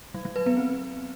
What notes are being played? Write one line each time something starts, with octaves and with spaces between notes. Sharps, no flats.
F#3
F#3
B4
B3
C4